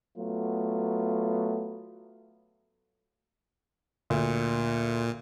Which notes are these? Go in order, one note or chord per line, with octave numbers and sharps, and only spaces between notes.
F#3 A3 B3 F4
D2 A#2